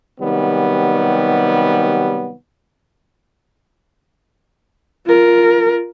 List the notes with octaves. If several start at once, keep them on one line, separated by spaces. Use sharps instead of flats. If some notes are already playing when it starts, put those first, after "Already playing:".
C3 D#3 F#3 G3 B3
F4 A#4